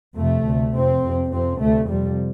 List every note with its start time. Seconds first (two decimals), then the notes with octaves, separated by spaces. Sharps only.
0.17 F2 C3 A3
0.46 D2 C3
0.74 F2 C3 C4
1.02 F2 C3
1.32 F2 C3 C4
1.59 D2 C3 A3
1.88 F2 C3 G3